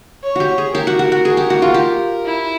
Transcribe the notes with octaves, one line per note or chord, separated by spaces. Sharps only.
C#5
F#4 G4
G#4
G4 A#4
F#4
F#4
F#4
G#4
G4
F#4
F4
G4
E4